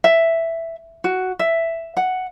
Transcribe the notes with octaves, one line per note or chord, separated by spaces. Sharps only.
E5
F#4
E5
F#5